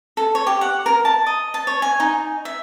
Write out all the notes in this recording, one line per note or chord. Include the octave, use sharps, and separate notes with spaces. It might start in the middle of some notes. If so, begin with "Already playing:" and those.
A4
C#5
G4
F#5
A#4
A5
D#5
A5
C#5
G#5
D#4
E5